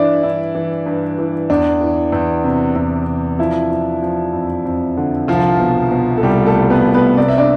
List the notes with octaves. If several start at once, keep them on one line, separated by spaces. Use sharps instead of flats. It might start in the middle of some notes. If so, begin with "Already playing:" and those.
Already playing: G2 E3 D4 E4 D5 E5
G2 E4
E3
G2
E3
E2 D4
E3
E2
C3
E2
C3
F3 E4
F3
F3
F2
F2
D3
C2 F3 F4
B2
B2
A4
C2 G3 G4
A3 A4
C2
B3 B4
C2
B3 B4
C3 D5
E5
D4 D5